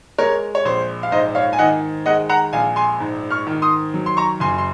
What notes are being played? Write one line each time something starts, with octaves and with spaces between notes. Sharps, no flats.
G#3 A#4 C#5
C#5
A#1 C5
F5
G#2 C5 D#5
C#5 F5
G#5
D#3 D#5 F#5
G#3 D#5 F#5
F#5 A#5
A#1 F5 G#5
G#5 C6
G#2
C#6 F6
D#3
C6 D#6
F#3
C6
A#5 C#6
F#1 G#5 C6
C6